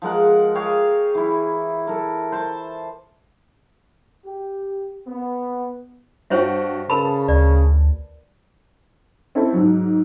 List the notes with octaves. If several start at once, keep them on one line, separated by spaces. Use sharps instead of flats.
F3 G#3 A#4 F#5
G4 G#4 C#5 F5
E3 E4
A4 A#4
C5 A5
G4
B3
G2 F#4 C5 C#5 E5 G5
C#3 A#4 B4 A5 B5
D2 D5
C4 C#4 E4 A4
G#2 F#3